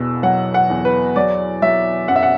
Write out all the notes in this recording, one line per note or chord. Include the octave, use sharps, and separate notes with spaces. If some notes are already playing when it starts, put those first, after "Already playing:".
Already playing: E2 B2 E6
F#3 F#5
F#5
E2
B4
F#3 D5
F#3 E5
F#2 F#5
E5
F#5